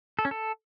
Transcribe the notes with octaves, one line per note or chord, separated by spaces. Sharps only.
A4
C#4
A4